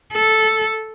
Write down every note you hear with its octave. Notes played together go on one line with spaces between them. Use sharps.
A4